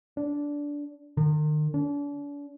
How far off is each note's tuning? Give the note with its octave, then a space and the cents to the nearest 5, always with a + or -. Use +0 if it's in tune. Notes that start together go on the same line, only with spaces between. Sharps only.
D4 -15
D#3 -40
D4 -40